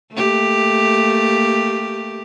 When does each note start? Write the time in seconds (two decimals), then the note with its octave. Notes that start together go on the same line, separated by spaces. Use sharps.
0.13 A3 A#3 G4